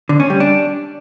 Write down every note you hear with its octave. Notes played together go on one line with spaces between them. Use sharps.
D3
C#4
G3
D4